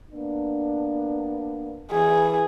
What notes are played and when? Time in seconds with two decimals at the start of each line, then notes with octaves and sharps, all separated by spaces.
0.11 A#3 B3 D4
1.92 E3 G#4